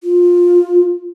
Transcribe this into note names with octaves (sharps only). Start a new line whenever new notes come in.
F4